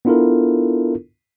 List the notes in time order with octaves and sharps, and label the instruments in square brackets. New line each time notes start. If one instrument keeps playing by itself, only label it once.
[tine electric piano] B3 D4 E4 F4 A4 A#4